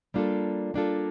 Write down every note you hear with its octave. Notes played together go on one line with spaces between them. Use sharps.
G3 A#3 D4 F4 A4
G3 A#3 D4 F4 A4